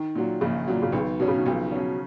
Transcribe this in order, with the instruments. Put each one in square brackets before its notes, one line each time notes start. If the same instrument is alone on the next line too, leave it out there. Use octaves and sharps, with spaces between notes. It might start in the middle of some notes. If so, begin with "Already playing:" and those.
Already playing: [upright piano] D#3
[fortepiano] A#2 F#3
[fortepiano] A#1 [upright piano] C#3
[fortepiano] A#2 F#3
[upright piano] C#3
[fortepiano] B1 [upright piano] D#3
[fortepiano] B2 F#3 C#4
[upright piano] C#3
D#3
[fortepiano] B1 [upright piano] F3
[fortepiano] B2 F#3 C#4